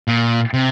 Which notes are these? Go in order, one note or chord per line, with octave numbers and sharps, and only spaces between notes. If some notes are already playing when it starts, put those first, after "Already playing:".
A#2
C3